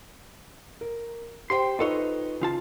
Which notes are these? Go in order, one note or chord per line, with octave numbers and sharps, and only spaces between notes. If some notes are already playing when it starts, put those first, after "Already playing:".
A#4
G4 C5 G5 C6
D#4 F4 A4 B4 C#5 D#5
C#3 F4 A5